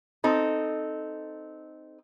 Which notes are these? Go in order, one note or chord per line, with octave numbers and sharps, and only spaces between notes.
C4 D#4 A4